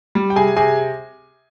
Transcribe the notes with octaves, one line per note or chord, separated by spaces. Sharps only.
G3
G5
C3 G#4 G#5
C3 G#4 G#5